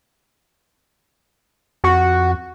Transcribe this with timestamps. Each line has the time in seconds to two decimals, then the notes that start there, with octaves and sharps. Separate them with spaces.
1.84 F2 F#4